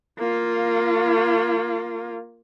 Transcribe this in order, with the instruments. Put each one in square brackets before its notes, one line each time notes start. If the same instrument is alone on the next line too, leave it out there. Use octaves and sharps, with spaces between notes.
[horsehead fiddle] A#3 F4